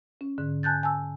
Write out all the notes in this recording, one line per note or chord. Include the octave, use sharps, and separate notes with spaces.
C#4
G#2 D3
G#5 A5 F#6 G6 A6
G#5 A5 E6